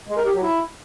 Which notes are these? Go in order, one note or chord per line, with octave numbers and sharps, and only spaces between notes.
G#3
A#4
G4
F#3
E4